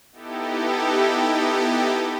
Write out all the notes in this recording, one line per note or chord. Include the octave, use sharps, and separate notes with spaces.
B3 D#4 E4 G4 A4